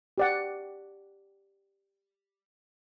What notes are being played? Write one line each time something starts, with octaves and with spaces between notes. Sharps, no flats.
G4 D5 F#5